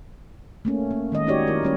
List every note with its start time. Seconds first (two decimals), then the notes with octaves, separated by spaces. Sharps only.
0.65 A3 A#3 C#4
0.91 A#3
1.12 D#3 G#3 D#5
1.27 C#4 D#4 F#4 G4 C#5 D5
1.47 D#3 E4 A#4
1.63 G3 C#4 C#5